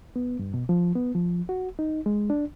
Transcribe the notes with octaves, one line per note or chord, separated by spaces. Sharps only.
B3
G2
B2
F3
B3
F3
F#4
D#4
G#3
D4